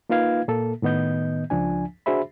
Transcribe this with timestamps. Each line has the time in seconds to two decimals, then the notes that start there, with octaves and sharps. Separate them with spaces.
0.10 A#3 D#4 F4 B4 F5 G#6
0.48 A#2 A#3 A4
0.82 A2 D#3 B3 D#5 G6
1.50 C#2 F3 D4 G#5
2.06 D4 F#4 G#4 C5 E5 B5